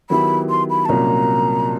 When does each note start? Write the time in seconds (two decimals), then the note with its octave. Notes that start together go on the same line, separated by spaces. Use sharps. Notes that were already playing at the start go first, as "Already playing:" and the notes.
0.10 D#3 F#3 B3 E4 G4 B5
0.50 C6
0.70 B5
0.85 A5
0.89 C2 A#2 F#3 A#3 C#4 A#5